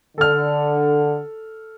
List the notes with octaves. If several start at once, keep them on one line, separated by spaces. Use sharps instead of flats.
D3 A4 F6